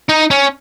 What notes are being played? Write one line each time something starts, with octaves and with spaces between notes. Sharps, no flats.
D#4
C#4